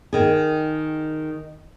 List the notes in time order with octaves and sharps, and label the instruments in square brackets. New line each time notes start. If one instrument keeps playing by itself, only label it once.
[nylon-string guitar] D#3 G#4